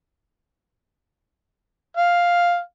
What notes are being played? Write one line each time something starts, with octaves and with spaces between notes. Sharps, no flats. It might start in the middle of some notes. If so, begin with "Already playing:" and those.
F5